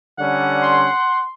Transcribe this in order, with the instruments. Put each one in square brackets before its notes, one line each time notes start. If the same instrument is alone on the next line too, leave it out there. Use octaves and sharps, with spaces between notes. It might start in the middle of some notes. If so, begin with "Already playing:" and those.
[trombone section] D3 G3 C#4 [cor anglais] F#5
[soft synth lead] C6